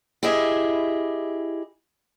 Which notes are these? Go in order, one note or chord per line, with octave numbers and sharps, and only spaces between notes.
E4 G4 G#4 D#5 E5